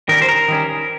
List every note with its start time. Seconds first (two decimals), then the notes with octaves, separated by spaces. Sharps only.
0.09 D#3 G3 C#4 A#4
0.22 C5
0.29 A#4
0.48 D#3 G3 C#4